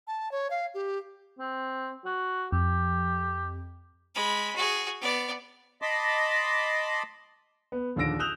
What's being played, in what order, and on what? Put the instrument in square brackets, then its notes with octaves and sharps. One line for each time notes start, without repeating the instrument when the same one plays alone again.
[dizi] A5
C#5
F5
G4
[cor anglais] C4
F#4
[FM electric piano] F2 [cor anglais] G4
[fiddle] G#3 B5
F#4 G#4
B3 D5
[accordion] D#5 A5 B5 C6 D6
[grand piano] B3
A#1 D#2 D3 E6 A#6 D7
D#6 E6 F#6 G6 E7 F7